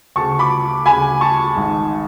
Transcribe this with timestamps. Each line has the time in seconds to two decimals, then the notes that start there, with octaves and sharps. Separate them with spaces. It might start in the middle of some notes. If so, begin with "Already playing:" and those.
0.16 D2 C#3 A5 C#6
0.39 B5 D6
0.85 D2 C#3 G#5 B5
1.21 A5 C#6
1.56 G#1 G#2